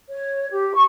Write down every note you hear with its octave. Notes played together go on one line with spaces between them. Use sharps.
C#5
G4
C#6